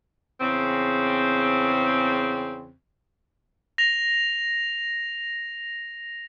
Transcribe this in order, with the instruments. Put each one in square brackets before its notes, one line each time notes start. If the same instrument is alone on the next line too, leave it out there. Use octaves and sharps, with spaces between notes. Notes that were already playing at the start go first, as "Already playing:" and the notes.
[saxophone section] E2 C#3 C4
[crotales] A#6 F7